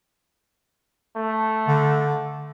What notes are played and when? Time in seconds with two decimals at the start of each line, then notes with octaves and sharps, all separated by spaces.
1.16 A3
1.68 D3